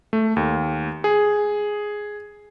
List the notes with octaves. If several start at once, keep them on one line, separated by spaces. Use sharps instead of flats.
A3
D#2
G#4